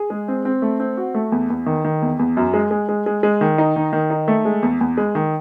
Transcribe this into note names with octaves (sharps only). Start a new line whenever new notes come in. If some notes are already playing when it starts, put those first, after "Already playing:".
Already playing: G#4
G#3
C4
C4
A3
C4
F#4
A3
E2
E2
D#3
D#3
E2
E2
F#2
G#3
G#3
G#3
G#3
G#3
D#3
D#4
D#3
D#3
D#4
A3
G#3
E2
E2
G#3
D#3